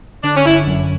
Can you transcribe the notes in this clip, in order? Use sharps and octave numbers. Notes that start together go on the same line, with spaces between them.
D3 D4
C#4
G1 E4
F#2